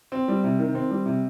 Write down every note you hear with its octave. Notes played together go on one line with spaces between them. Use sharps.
C4
G3
C3
D#3
C4
G3
C3